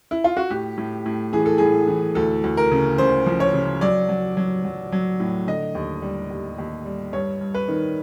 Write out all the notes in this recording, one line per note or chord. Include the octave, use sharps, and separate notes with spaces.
E4
F4
F#4
A2 G4
A2
A2
E3 G#4
A4
A2 G#4
E3
D2 A4
D2
A#4
C#3
C#3 C5
F3
C#5
C#3
F#3 D5
F#3
F#3
F#3
F#3
A2
D3 D#5
D#2
G3
D#2
D#2
G3
G2 C#5
G2
B4
D#3